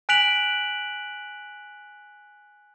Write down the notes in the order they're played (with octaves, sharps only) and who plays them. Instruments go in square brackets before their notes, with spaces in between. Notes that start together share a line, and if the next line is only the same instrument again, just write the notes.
[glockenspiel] G#5 F#6 B6 D7 F7 F#7